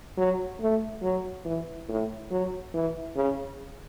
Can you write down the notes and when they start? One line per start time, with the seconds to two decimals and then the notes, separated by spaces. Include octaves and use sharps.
0.18 F#3
0.61 A3
1.02 F#3
1.45 E3
1.89 A2
2.31 F#3
2.74 E3
3.16 C#3